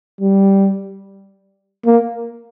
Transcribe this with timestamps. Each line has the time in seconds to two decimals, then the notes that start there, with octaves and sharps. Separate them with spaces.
0.21 G3
1.86 A#3